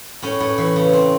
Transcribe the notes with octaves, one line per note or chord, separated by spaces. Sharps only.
A2 C#4
A2
E3
C#3
C4